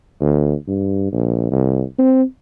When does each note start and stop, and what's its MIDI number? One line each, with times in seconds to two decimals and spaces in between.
0.21 0.54 38
0.67 1.10 43
1.12 1.47 34
1.51 1.83 36
1.99 2.23 60